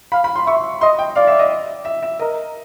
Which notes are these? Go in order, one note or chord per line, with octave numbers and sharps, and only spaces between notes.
F5 B5
B5
C6
E5 C#6
D#5 C6
G5
D5 F5
E5
D#5
E5
E5
A#4 D#5